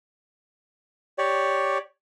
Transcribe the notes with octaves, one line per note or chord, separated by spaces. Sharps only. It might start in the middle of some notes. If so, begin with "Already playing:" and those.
G4 C#5 D5